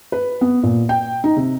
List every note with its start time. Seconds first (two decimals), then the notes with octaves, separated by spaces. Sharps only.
0.12 B4
0.41 B3
0.63 A#2
0.89 G5
1.24 D#4
1.36 C3